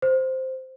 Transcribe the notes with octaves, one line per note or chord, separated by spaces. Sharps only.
C5